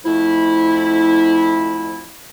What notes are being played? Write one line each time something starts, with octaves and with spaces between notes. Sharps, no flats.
F2 F3 A3 E4